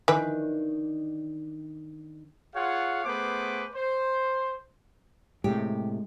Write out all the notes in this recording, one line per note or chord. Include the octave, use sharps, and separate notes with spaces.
D#3 E3 D4 B4
F4 G#4 C#5 F5 F#5
A3 B3 G#4 B4 C5 D6
C5
A2 C3 G#3 G4